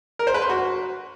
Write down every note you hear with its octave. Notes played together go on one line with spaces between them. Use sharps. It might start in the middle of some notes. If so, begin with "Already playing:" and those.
A#4
C5
B4
C6
F#4